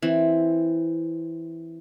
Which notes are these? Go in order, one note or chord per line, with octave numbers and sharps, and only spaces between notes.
E3 C4